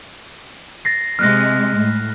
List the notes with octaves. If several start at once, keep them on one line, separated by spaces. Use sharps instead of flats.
A6 A#6 C7
C3 G#3 F6 F#6 A#6
A2